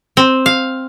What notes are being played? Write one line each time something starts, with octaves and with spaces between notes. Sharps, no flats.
C4
F5